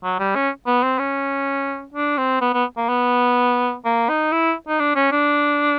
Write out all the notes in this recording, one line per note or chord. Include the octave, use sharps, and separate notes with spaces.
F#3
G3
C#4
B3
C4
C#4
D4
C4
B3
B3
A#3
B3
A#3
D#4
E4
D#4
D4
C#4
D4